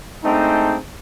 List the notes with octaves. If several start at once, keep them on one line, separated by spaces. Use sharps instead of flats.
G#3 A3 C4 D4 D#4